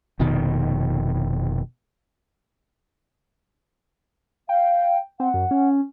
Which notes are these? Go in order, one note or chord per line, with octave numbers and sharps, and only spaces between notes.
F1 B2 D#3
F5 G5
C4 F#5
F#2
C#4